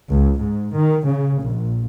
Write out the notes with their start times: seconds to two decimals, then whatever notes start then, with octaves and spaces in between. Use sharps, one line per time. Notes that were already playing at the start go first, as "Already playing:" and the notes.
0.11 C#2
0.40 G#2
0.73 D#3
1.06 C#3
1.44 A#1